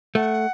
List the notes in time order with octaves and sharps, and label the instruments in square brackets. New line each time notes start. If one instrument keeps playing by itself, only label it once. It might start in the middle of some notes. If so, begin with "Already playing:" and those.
[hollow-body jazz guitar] A3 [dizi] F#5